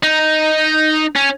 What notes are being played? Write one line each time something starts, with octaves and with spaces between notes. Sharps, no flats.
D#4
C#4